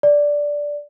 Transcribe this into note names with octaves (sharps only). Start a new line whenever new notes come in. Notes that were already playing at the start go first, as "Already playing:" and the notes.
D5